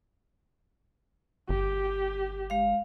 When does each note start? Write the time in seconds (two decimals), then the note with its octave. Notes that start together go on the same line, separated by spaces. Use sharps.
1.49 G1 G4
2.50 G#3 F5